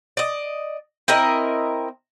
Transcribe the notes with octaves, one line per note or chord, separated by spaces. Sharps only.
D5 D#5
C4 E4 A#4 D#5